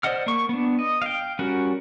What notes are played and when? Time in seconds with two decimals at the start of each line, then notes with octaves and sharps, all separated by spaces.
0.03 C5 D5 D#5 F#5 F6
0.26 A#3 C#6
0.49 B3 D4
0.79 D#5
1.02 F5 G5
1.39 G3 C#4 F#4 A#4 F#5